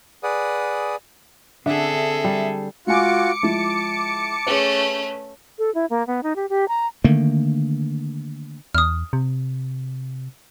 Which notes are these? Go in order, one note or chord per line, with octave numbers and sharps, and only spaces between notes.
G#4 B4 D5 F#5 D#6
D3 C4 G#4 A4 E5
G3
G#3 F4 F#4 G#5 D6 C#7
F3 G#3 E4 A5
A3 C#4 G#4 B4
A4
E4
A#3
B3
D#4
G4
G4
A#5
D3 D#3 A3 A#3
E2 D#6 F6
C3